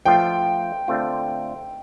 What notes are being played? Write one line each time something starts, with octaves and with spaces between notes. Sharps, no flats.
F3 A3 F4 G5
D3 A3 C4 F4